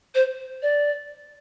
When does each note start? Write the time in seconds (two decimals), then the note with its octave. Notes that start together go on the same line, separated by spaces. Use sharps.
0.15 C5
0.62 D5